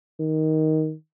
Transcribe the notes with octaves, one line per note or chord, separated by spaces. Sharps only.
D#3